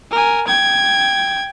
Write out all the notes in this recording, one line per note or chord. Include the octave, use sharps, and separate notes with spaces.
A#4 G#5
G5 G#6